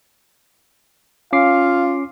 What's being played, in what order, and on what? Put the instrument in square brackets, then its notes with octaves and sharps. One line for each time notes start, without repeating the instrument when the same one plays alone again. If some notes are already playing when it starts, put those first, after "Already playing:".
[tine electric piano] C#4 D6 C7 [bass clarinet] F4 [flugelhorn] F5